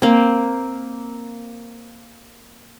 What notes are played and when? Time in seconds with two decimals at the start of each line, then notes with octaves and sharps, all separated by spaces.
0.02 A#3 C4